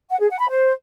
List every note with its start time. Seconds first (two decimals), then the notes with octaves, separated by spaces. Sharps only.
0.10 F#5
0.20 G#4
0.30 F#5
0.40 B5
0.50 C5